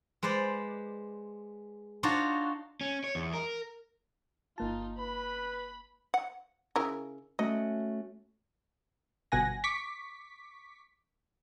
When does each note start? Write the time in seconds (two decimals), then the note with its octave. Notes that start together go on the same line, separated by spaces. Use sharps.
0.23 G#3 B4 C5 D5
2.03 D4 D#4 F4 F#4 C#5
2.81 C#4
3.04 C#5
3.15 E2
3.33 A#4
4.58 G1 A#3 D#4 F4 A5
4.98 B4 B5
6.14 F#5
6.76 C#3 E4 A#4
7.39 A3 C#4 F#4 D#5
9.32 G1 B2 F#5 G#5 A#6
9.64 C#6 D6 B6